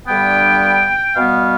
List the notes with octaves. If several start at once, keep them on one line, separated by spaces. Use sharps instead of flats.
G2 D3 G3 B3 G5
B2 G3 B3 F5